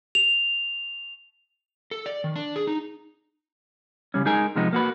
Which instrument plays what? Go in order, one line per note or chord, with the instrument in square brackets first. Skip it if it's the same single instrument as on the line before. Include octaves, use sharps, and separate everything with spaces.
[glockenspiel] F7
[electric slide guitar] A4
D5
D#3
D4
G#4
D#4
[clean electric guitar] C#3 G3 C#4
G#3 D#4 G#4 A#4 G#5
C3 F3 G#3 B3 D#4
A#3 F#4 B4